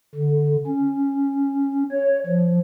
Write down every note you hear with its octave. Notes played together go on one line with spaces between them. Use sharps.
D3
C#4
C#5
F3